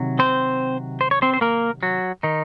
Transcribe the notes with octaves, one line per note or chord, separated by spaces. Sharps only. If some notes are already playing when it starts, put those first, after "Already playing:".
Already playing: C3 D#3 F#3
C4 C5
C5
C#5
C4 C5
C5
A#3 A#4
F#3 F#4
D#3 D#4